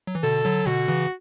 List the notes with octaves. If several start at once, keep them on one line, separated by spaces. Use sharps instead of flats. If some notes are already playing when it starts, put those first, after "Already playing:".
F#3
E3
B2 D3 A4
D3 F#3
B2 D3 F#4
C#3 E3